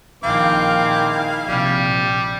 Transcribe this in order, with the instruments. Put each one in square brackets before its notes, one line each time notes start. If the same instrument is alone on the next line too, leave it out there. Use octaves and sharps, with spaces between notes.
[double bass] A#1 [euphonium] D#3 [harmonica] C4 D6 [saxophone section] E4 G#4 F5
[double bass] A#1 C3 [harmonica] G3